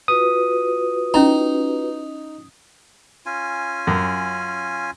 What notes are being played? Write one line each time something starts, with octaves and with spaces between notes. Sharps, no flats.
F4 F#4 B4 D#6
C#4 D#4 E4 A#5
C#4 F4 G#5
F#2